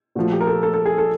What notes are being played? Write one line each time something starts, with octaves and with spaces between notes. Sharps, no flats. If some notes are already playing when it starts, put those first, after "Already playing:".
A#2 F3 A3 F#4
G4
A#4
A4
A4
A4
G#4
A4